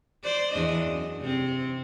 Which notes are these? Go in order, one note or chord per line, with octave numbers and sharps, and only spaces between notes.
C5 D5
E2 D4 D#5
F#2
C3 C4